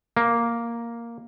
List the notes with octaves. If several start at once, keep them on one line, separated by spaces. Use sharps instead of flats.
A#3